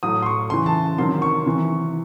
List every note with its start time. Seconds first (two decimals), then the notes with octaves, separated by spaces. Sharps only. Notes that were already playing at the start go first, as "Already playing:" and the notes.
0.03 A2 F#3 D#6
0.22 C6
0.26 C#6
0.50 C#3 E3 C6
0.66 A5
0.98 C3 D#3 F#3 C6
1.22 C#6
1.46 C3 E3